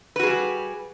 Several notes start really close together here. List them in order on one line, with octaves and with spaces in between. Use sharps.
B4 F#4 G#4 G3